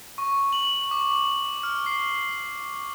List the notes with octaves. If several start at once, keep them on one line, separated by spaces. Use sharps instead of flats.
C#6
F#7
D6
F6
C7